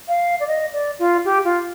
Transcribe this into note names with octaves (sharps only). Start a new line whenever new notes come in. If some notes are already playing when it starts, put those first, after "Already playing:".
F5
D5
D#5
D5
F4
G4
F4